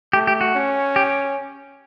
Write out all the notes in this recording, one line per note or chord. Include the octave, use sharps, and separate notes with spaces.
A3 G4
G4
F#4
C#4
G4